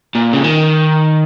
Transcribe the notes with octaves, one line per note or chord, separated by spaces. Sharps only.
A#2
C#3
D#3